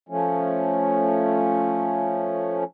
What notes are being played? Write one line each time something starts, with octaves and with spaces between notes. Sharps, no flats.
F3 A3 C#4